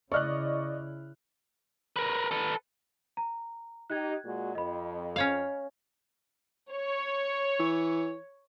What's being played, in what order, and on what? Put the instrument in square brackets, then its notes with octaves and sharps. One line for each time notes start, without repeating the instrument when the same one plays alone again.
[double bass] C#3 E4 [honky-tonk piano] D5 D#5 [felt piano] C#6 F6 F#6
[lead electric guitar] A#4 B4
A4 B4
[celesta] A#5
[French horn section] D#4 G4 [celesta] F#6 G#6
[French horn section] A#2 G#3 F#4
[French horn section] F2 [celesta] D#5 B5
[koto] C#4 C#5 F5
[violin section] C#5
[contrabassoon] E3